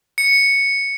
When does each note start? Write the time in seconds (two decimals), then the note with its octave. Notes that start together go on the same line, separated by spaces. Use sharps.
0.18 C#7